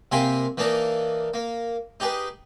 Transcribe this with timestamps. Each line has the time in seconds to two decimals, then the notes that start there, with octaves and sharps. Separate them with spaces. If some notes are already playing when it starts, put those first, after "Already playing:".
0.12 C3 A#3 C4 G#5 B5 C6
0.58 E3 A#3 D4 D#4 A#4
1.34 A#3
2.00 D#4 G4 G#4 B4